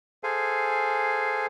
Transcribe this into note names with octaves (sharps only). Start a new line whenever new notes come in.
G#4 A4 C5 F5 G#5